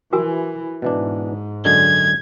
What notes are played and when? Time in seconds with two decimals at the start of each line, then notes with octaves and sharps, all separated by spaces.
0.13 E3 F#4 A#4 G#5
0.82 G#2 B2 E3 D4
1.65 F#2 D3 G#3 G#6